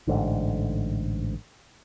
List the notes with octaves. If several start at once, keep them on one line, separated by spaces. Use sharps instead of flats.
A1 G#2 D3